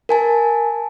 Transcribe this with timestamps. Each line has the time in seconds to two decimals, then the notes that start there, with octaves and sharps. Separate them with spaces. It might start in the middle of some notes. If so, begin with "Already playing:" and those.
0.09 A#4 G#5 A5